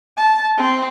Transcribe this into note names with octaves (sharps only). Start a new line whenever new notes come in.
A5
C4